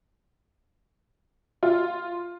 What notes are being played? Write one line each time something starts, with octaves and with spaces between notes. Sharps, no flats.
F4